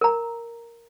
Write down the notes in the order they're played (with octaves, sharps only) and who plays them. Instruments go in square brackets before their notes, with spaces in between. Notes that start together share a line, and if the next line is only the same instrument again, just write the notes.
[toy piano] A#4 A#5